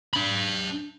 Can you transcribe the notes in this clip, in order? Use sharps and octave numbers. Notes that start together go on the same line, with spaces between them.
D4 B5